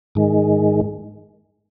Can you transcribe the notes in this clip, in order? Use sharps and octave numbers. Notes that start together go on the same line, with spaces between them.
G#2 D#3 G#3